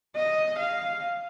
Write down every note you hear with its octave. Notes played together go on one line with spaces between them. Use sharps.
D#5
F5